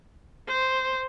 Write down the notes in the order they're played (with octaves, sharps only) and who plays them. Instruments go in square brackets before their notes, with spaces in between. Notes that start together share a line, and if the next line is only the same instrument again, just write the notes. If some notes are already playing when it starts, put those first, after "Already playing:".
[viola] C5